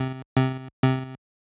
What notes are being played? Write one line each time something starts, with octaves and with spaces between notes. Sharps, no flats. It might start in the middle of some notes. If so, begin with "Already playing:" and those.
Already playing: C3
C3
C3